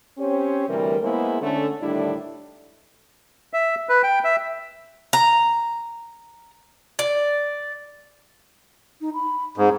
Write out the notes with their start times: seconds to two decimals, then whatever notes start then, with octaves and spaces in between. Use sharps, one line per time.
0.18 C4 C#4 G4 C5 C#5
0.68 D2 C3 E3 G3 A#4
1.02 G#3 A#3 B3 E4 G#4 C5
1.40 D3 A3 C#4
1.81 A2 D3 D#3 G3 D4 E4
3.53 E5
3.89 B4
4.03 G5
4.24 E5
5.13 A#5
6.99 D5
9.01 D#4
9.14 B5
9.57 G#2 C4